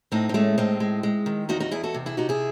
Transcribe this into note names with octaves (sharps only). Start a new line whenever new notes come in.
A2 C4 D#4
C4
G#3 A3 C#4
A2 C4 D#4
G#3
G#3
D#3
E2 D#4 F#4
D#4 F#4
E2 E4 G#4
F#4 A4
C3
E4 G#4
C3 D#4 F#4
E4 G#4